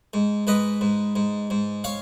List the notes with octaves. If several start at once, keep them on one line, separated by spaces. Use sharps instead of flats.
G#2
G#2 B4 D#5
G#2
G#2
G#2
C#5 F5